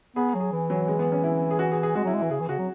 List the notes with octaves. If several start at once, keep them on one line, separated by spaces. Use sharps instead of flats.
B3 G#4
F#3
G#4
E3
F#3
G#3
B3
C#4
E4
G#4
F#4
G#4
G#4
G#3 F#4
F#3 E4
G#3
E3 E4
C#3 G#4
E3
C#3 F#4
F#3